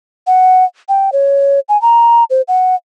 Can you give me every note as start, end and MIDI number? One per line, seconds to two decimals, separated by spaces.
0.27 0.65 78
0.89 1.10 79
1.12 1.60 73
1.69 1.80 80
1.82 2.24 82
2.30 2.42 72
2.48 2.75 78